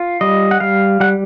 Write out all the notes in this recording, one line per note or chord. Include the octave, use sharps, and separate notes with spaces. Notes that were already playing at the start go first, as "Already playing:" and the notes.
Already playing: F4
G3 D#5
F#5
G3 F5
G3 F#5